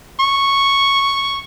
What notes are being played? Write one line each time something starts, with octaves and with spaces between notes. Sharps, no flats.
C#6